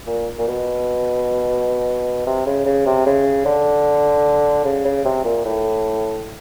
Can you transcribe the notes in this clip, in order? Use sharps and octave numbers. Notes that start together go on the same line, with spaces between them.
A#2
A#2
B2
C3
C#3
C#3
C3
C#3
D3
C#3
C#3
C3
A#2
A2